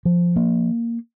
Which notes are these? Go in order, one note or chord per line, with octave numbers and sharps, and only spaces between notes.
F3
A#3